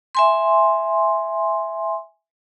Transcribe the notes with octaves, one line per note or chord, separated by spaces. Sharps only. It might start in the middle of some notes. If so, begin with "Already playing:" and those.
E5 G#5 C6